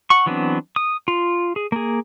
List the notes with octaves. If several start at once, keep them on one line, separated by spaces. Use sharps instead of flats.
F#5 C#6
E3 F#3 B3 C4 D4
D#6
F4
G#4
A#3 G#4